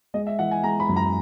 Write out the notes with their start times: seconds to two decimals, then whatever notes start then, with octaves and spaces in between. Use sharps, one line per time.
0.14 G#3 D#5
0.27 E5
0.39 E3 F#5
0.51 G#5
0.63 G#3 A#5
0.80 B5
0.89 F#2
0.96 A#5